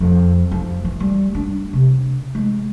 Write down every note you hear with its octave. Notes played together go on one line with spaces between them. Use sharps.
F2
F3
E3
G3
D4
C3
G#3